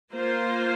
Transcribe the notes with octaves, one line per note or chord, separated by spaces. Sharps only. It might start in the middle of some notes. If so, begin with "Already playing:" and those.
A#3 F4 C5